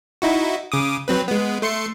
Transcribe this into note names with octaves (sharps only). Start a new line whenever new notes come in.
D#4 E4 F#4
C#3 D6 D#6
F#3 C4 B4
G#3 B3
A3 C6 C#7